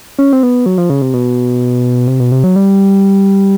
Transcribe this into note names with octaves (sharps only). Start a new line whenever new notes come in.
C#4
C4
B3
F#3
F3
C#3
C3
B2
C3
B2
C3
F#3
G3